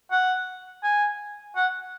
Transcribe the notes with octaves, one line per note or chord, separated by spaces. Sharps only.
F#5
G#5
F#5